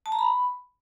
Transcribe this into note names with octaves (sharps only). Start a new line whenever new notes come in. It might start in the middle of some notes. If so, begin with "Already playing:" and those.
A5
A#5
B5